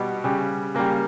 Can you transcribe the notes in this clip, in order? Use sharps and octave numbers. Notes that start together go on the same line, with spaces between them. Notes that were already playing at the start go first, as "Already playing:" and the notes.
Already playing: B2 G3 B3
C#3 G3
C#3 G3 A#3